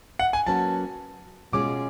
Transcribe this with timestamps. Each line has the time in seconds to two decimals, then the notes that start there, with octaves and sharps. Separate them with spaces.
0.19 F#5
0.33 G#5
0.46 F#3 A#3 C#4 F#4 B4 A5
1.53 B2 G#3 C#4 F4 G#4 D6